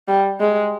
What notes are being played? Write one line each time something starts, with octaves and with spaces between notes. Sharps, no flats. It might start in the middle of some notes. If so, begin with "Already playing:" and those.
G3
G#3